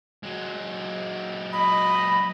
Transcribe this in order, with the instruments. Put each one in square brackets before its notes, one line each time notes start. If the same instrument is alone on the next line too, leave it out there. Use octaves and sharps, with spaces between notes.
[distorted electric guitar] F#3 G#3
[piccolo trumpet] D#5 [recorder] B5